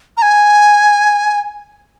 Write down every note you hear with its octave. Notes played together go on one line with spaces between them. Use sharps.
A#5
G#5